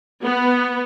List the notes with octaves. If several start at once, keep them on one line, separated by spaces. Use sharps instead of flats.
B3